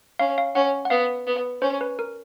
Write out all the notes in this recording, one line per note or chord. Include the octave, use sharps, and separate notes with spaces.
C#4 F5
F5
C#4 F#5
F#5
B3 F5
B3
C#4 C5
B4
A#4